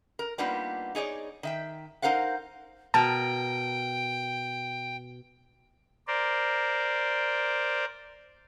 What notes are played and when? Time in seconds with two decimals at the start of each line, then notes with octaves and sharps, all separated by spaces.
0.19 A#4
0.38 G3 A#3 B3 D4 D#4 F4
0.95 D#4 G#4 C#5 D5
1.43 D#3 E5 G5
2.02 D#4 A#4 C5 F5 F#5
2.94 B2 A#4 G5 A5
6.07 A#4 C5 D5